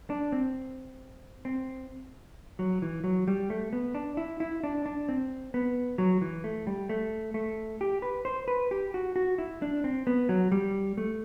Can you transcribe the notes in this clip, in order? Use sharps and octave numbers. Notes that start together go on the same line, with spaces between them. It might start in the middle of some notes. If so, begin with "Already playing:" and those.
D4
C4
C4
F#3
E3
F#3
G3
A3
B3
D4
E4
E4
D4
D4
C4
B3
F#3
E3
A3
G3
A3
A3
G4
B4
C5
B4
G4
F#4
F#4
E4
D4
C4
B3
F#3
G3
A3